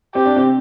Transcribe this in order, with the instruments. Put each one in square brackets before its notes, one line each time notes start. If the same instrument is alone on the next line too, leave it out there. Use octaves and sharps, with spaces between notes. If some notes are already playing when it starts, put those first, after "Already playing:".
[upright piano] C4 [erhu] G4
[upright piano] D4
C3 C4